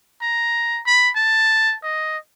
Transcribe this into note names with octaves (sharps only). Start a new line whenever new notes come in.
A#5
B5
A5
D#5